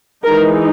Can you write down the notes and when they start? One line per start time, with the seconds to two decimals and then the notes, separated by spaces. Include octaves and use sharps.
0.25 E3 G#3 D#4 A#4